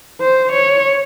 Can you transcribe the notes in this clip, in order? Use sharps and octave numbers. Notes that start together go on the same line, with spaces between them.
C5
C#5